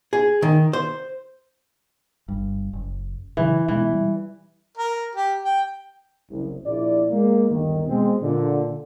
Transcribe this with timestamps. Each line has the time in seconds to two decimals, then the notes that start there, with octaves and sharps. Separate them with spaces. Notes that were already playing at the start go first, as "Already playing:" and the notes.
0.13 G#4
0.42 D#3
0.73 C5
2.28 G1 G2
2.73 F#1
3.37 C#3 E3 F#3
3.68 B2 E3 G#3 B3
3.93 G3
4.77 A#4
5.15 G4
5.44 G5
6.29 F#1 C2
6.65 A#1 E4 D5
7.10 G#3 A#3
7.49 G1 D#2 D#3
7.86 B2 G#3 C4
8.22 A#2 D3